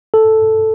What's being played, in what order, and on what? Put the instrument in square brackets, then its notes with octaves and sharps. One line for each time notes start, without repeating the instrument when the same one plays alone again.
[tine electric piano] A4